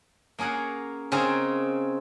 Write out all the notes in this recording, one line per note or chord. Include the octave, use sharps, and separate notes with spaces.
A#3 C#4 G#4 A#4 F#5
C#3 C4 D#4 G#4 A#4